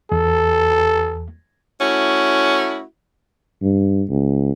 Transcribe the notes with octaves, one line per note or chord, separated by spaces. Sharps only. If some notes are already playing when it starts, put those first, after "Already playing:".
E2 A4
A3 C#4 E4 F#4
G2
C#2